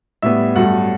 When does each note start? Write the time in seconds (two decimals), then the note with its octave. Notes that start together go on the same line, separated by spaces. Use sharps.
0.22 A2 G3 B3 E5
0.56 G2 F#3 A3 F#5